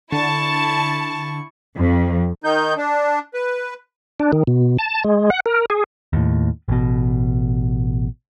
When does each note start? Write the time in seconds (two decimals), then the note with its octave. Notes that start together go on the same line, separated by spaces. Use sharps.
0.12 D3 E4 A5 C#6
1.76 F2
2.44 D#3 D#4 G6
2.77 D4
3.34 B4
4.20 D4
4.32 D#3
4.47 B2
4.79 A5
5.04 G#3
5.30 F#5
5.46 A#4
5.70 G#4
6.13 D#2 A2
6.68 A1 B2